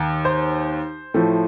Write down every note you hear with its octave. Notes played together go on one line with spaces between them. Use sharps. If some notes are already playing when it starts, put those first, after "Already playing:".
Already playing: D#2
C5
A2 F3 A3